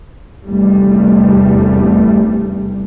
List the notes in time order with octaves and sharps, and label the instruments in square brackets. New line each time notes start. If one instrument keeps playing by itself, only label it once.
[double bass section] F1 E2 G2 C3 G3 A3